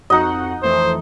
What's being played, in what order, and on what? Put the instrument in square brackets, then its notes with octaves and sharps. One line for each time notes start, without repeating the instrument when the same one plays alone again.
[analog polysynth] F2 F#4 F#5 [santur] D#4 D#5
[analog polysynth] F2 E3 A3 [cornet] C5